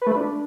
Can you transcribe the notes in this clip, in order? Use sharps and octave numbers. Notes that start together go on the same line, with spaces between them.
B4
A3
B4
D4